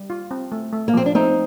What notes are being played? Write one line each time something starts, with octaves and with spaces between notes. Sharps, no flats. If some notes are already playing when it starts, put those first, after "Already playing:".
Already playing: G3
F4
C4
A3
A3
A#3
F3 C4
D4
A3 C4 D#4